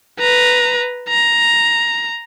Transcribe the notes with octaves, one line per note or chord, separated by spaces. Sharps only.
B4 A#5
A#5